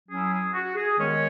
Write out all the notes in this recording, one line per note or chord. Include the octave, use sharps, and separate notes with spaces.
F#3 C#4 E4 G#4
G#4
F#4
G#4
D#3 G#3 B3 C#4 C#5